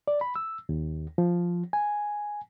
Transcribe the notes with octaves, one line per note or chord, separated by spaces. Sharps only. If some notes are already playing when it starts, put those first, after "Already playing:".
D5
B5
E6
D#2
F3
G#5